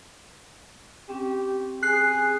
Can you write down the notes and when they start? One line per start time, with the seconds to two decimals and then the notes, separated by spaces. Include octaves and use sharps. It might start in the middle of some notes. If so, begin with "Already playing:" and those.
1.09 C4 C#4 G4
1.83 G#4 F#6 C7